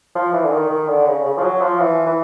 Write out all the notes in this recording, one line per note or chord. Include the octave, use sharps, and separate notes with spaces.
F3
E3
D3
D#3
D#3
D3
C#3
C#3
F3
F#3
F3
E3
E3